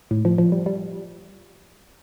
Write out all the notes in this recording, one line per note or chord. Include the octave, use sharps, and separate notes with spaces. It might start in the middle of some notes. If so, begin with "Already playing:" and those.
A2
F3
F3
G3
G3